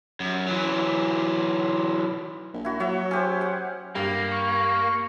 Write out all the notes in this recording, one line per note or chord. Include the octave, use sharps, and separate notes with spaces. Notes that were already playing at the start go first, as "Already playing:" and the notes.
F#2
E3 F#3
A#1
E4 F#4
F#3 C#5 E5
C#4 G4 C5
F#5
G2 A#3 G4 F6
C#6